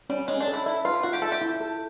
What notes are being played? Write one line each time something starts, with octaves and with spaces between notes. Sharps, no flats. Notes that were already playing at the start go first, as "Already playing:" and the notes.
G3 C#4
G#3 C#4
D4
A4
E4
E4 E5
F4 B4
F4 F#4
G4
A4 E5
G4
E4
A4